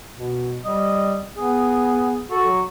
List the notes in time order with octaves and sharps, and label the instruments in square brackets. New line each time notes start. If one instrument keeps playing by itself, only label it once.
[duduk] B2
[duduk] G3 [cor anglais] D#5
[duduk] B3 [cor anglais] G#4
[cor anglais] F#4 [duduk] A4
[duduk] F#3